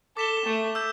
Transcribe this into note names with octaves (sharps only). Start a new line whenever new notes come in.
A4 D6 B6 E7 G7
A3
E6 G6